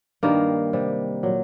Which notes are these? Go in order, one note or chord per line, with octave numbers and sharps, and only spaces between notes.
G2 D#3 G3 A#3
C3 G3
A#2 F#3